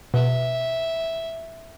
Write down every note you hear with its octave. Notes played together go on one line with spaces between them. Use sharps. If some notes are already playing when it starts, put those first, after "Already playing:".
B2 E5